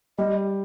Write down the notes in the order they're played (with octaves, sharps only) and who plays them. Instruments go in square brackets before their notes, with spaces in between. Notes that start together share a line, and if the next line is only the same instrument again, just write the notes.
[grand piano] G3 [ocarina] D#5